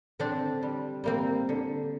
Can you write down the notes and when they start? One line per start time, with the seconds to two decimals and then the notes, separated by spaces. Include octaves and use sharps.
0.19 D3 C4 D4
0.63 G3
1.04 G3 A#3 C4
1.49 D3